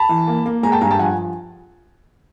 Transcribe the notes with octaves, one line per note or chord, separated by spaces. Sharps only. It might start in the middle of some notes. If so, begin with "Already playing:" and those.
Already playing: A5 B5
E3
A#3
A#3
G#3 G#5 A#5
G5 A5
G2 G#5 A#5
G5 A5
F3 F#5 G#5